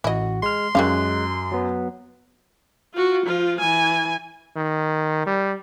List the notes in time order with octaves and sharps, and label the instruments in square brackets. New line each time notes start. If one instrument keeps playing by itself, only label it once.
[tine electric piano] A1 F#4 [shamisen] E4 D#5
[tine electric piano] G#3 F6 [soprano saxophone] C6
[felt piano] F#2 [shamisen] D#3 G4 F5 [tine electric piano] G#3 F#6
[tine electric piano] F#3 B3
[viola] F4 F#4
F3 F4
E3 G#5
[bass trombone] D#3
G3